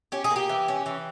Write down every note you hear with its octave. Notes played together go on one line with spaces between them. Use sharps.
C#4 G4
G#4
A#3
G4
E3
C#4
E3